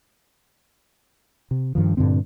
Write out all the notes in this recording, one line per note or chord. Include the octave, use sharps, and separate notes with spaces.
C3
G2 D#3 F3
G2 A#2 D3 C4